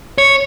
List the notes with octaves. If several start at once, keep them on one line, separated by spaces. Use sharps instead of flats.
C#5